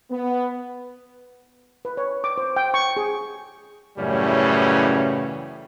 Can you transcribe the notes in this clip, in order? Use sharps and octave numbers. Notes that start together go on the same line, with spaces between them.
B3
B4
C#5
D6
C5
G5
C#6
G#4
F#2 A2 C#3 E3 G3 C#4